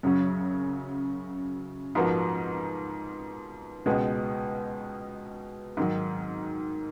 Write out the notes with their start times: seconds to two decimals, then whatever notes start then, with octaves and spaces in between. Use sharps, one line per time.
0.03 F#2 C#3 F#3 C#4
1.95 G#2 F3 B3 F#4 A#4
3.86 C#2 B2 G#3 B3
5.77 G#2 D#3 F#3